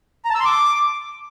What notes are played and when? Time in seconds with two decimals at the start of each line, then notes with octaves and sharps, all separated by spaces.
0.25 A#5
0.30 A5
0.35 E6
0.40 C6
0.45 D6